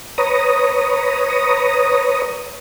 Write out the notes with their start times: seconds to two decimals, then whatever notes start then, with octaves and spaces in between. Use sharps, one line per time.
0.18 B4 C#5 A#5 D#6